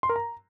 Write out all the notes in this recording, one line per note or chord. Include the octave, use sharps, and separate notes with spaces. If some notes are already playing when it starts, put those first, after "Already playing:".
C6
A#4
A#5